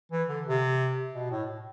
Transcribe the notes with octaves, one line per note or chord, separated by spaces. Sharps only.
E3
D3
C3
B2
A2